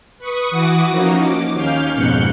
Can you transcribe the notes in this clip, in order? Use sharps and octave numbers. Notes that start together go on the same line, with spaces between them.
B4 C#6 D#6
E3 F#4 F#5 D6 D#6
F3 A#3 C#4 D#4 F#4
D6
D#2 C#4 F5 F6 G6
F2 G#2 B2 F#6 G6 C#7